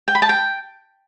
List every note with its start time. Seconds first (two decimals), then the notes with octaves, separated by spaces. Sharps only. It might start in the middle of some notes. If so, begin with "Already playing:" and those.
0.08 G5
0.15 B5
0.22 A5
0.29 G5